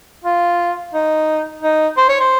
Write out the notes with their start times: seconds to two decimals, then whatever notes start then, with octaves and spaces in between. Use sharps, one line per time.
0.24 F4
0.94 D#4
1.63 D#4
1.97 C5
2.09 C#5
2.20 C5